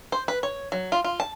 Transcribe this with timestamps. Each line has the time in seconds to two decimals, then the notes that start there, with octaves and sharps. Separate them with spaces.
0.12 C5
0.28 B4
0.43 C#5
0.72 F#3
0.92 F4
1.04 F4
1.20 A5